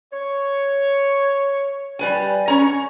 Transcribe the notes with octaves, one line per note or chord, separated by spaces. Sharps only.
C#5
G3 B4 G#5
C#4 C#5 A#5